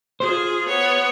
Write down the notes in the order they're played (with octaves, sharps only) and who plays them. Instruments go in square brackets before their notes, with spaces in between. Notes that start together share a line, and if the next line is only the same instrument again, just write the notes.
[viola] F4 G#4 [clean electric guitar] C5
[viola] B3 C#5